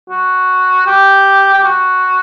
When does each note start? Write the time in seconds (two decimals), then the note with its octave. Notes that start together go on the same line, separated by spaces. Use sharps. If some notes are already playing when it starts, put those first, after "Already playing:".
0.10 F#4
0.87 G4
1.54 G4
1.64 F#4